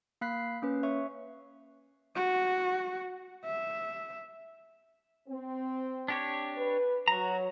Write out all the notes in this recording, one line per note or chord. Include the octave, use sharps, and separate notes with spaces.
A#3 F5 B5 F#6 B6 C7
A#3 C#4 B4
C#5 E5 C#6
F#4
E5
C4
D4 G4 C#5
B4
F#3 F#4 A#5